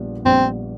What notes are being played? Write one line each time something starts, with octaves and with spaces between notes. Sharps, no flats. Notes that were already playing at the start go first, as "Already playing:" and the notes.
Already playing: A#1 A#2 G3 B3
A#1 A#2 G3 B3 C4